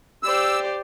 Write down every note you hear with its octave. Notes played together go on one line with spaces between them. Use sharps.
G4 C5 D5 E6